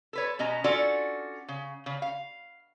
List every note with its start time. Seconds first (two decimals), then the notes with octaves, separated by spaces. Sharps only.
0.13 A4 B4 C#5
0.39 B2 C#4 D#5 A#5
0.64 C#4 D4 F4 F#4 A4 D5
1.48 C#3
1.86 C#3
2.02 F5